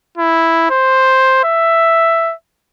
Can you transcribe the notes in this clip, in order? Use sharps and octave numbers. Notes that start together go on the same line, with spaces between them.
E4
C5
E5